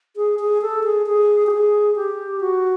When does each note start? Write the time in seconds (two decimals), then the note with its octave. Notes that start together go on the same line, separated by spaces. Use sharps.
0.16 G#4
0.39 G#4
0.62 A4
0.84 G#4
1.06 G#4
1.47 G4
1.51 G#4
1.96 G4
2.41 F#4